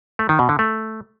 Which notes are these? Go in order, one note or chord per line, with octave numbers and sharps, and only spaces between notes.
A3
D#3
B2
D3
A3